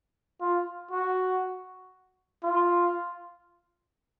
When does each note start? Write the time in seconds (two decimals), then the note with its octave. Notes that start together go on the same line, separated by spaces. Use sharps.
0.41 F4
0.91 F#4
2.43 F4